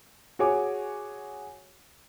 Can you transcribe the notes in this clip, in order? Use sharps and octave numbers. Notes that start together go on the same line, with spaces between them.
F#4 G#4 C#5 G#5 D6